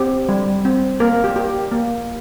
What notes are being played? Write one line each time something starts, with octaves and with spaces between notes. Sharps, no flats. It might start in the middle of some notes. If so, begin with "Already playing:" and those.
Already playing: C4 G4
G3
C4
A#3 A#4
G4
G4
A#3